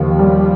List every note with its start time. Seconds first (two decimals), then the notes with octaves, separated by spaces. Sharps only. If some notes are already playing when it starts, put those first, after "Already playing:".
Already playing: D#2 F3
0.19 G3